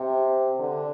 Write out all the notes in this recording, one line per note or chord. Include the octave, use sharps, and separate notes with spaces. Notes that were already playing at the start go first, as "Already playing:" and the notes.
Already playing: C3
D3